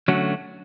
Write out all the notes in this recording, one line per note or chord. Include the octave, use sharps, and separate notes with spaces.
D3 F#3 A3 C#4 F#4